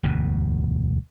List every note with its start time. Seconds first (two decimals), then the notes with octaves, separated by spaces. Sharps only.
0.03 E1 D2 G2 B2